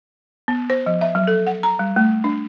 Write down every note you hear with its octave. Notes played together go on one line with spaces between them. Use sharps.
B3
C5
F3
E5
F#3
A4
F#5
A#5
G3
A3
D4